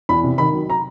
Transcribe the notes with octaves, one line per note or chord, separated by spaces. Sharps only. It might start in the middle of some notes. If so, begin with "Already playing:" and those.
E2 B5
C3
D#3 B5
F#3
A#5